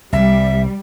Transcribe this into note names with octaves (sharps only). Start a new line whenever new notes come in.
C2 G3 E5